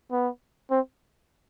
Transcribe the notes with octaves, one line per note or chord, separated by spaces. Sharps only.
B3
C4